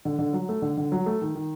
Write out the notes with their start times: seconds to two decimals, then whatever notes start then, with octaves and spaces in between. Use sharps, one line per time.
0.05 D3
0.19 D3
0.33 F#3
0.49 A3
0.62 D3
0.77 D3
0.92 F#3
1.06 A3
1.21 D#3
1.35 D#3